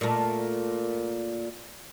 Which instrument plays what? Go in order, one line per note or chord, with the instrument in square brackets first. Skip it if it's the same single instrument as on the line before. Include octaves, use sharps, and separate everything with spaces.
[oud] A#2 A3